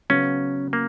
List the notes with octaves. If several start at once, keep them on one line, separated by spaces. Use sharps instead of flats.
C#3 F#3 B3 C#4
A#3